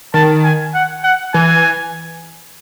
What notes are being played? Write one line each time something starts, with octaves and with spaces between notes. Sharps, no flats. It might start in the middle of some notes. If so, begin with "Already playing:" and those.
D#3 A5
G#5
F#5
F#5
E3 G#5